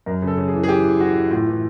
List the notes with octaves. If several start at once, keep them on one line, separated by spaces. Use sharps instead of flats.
F#2 A#4
C#3
A4
C#3
G#4
E3
G#4
E3 G4
E3
E3 F#4
E3
A2 F4
E3